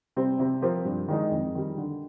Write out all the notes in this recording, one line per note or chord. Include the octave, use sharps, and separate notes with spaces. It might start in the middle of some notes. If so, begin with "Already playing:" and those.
C3 G3 C4
C3
F3 C4 G4 A#4
G2
D#3 G#3 D#4
F2
D#3 G3
D3